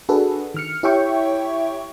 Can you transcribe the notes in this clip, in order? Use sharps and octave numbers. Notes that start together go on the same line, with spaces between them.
D4 F#4 G#4 A4 B4
D#3 F6 C#7
E4 G4 C#5 E5 G5 C#6